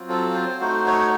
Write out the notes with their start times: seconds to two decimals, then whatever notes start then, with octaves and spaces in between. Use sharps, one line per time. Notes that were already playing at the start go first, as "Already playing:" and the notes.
Already playing: F#3 C4 F4
0.09 A4
0.34 C5
0.60 A3 D#4 F#4 C5
0.87 C#5